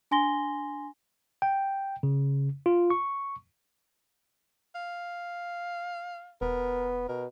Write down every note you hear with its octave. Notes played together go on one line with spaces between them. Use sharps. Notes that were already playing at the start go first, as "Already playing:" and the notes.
D4 G#5 C6 A#6 G7
G5
C#3
F4
C#6
F5
E1 B3 A#4
B2 A#4